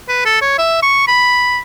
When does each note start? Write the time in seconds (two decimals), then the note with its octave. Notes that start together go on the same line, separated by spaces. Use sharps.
0.09 B4
0.25 A4
0.42 C#5
0.58 E5
0.83 C#6
1.08 B5